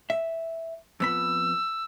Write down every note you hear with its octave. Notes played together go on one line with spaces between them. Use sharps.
E5
F2 B3 B5 E6